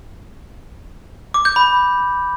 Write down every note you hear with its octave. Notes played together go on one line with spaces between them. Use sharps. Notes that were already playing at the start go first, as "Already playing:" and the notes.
D6
G6
B5